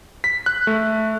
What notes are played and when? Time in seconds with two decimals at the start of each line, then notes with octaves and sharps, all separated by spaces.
0.24 B6
0.46 F#6
0.67 A3